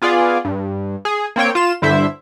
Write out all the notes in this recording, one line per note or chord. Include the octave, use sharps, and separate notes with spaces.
B3 F4 G#4 D5
G2
G#4
A#3 C4 C#5 G5
F4 E7
G2 D3 E4 C5 E5